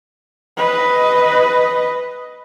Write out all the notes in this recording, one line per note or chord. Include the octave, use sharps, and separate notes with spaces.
B4 D#5